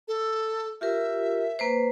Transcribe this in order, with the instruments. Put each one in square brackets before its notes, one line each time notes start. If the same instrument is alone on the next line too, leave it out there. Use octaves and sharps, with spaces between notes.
[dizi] A4
[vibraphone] F4 G4 A#4 [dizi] E5
[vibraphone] A#3 B4 C5